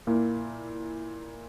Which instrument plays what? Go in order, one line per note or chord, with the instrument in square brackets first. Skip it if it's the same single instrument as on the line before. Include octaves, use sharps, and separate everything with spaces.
[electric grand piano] A#2 A#3 E4